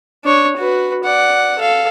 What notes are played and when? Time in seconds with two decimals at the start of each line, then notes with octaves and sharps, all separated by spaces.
0.24 D4 C#5
0.57 F#4 B4
1.04 D5 F#5
1.59 A4 F5